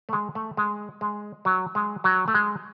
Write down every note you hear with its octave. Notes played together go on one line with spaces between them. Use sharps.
A3
G#3
A3
G#3
G#3
F#3
G#3
F#3
A3
G#3